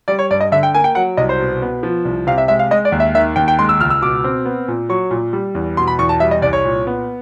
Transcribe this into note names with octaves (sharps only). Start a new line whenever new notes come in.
G3 D5
C#5
G2 D5
D#5
D3 E5
G5
A#3 G#5
G5
F#3 F#5
C2 D#5
C5
B2
B3
F3
C2
C3 F5
E5
G#3 E5
F5
G#3 D#5
D5
D#2
E5
D#3 E5
D#2 G5
G5
G#3 C6
E6
C#2 F6
E6
B2 D6
C4
B3
A#2
F#3 C#6
A#2
G3
E2
B2 C6
B5
E2 C#6
A5
G3 E5
D#5
C2 D5
C#5
A#2
B3